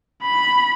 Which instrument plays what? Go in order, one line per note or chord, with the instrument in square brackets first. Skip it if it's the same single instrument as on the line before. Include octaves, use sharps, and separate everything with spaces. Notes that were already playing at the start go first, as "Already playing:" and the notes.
[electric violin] B5